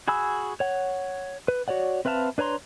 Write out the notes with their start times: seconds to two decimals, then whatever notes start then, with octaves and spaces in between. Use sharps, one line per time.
0.08 F#4 G#4 G#5 B5 E6
0.60 C#5 F#5
1.48 B4
1.68 F#4 C#5 D5 F#5
2.05 C4 B4 E5 F5 A5
2.38 D4 B4 C#5 A#5 C6